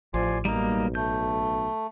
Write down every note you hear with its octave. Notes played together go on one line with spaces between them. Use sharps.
A1 F3 D5 G#5 C6
B1 G3 A#3 D#4
A3 G6